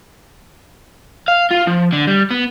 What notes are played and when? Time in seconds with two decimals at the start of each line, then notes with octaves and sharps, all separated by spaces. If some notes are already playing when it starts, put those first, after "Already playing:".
1.28 F5
1.51 F4
1.67 F3
1.93 D3
2.07 G3
2.31 B3